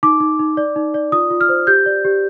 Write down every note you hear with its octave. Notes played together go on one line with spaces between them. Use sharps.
D#4 D6
D#4
D#4
D5
D#4
D5
F4 D#6
F4
F6
C5
G4 G6
D5
G4